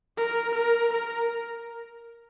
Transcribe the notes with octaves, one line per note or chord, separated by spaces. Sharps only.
A#4
A#4
A#4